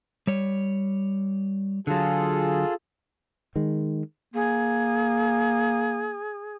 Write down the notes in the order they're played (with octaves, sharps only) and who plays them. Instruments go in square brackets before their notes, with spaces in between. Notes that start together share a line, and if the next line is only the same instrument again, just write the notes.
[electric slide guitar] G3 C#5
[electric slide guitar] D3 F#3 [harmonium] F4 G#4 A4
[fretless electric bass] D#3 G#3
[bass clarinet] A#3 [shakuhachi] G#4